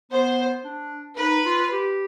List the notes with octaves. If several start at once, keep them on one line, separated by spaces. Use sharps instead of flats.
B3 C5
D4
D#4 B4
F4
G4